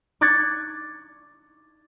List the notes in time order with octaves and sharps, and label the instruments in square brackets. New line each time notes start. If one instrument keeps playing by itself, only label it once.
[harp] C#6 D6 F#6 G#6 A6 C#7